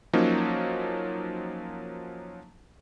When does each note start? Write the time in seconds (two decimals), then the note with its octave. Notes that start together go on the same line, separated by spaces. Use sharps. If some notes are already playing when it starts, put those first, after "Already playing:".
0.13 F3 F#3 A#3 C#4 D#4